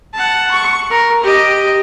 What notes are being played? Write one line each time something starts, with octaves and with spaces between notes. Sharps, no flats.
F#5 A5
C#6
A#4
G4 D#5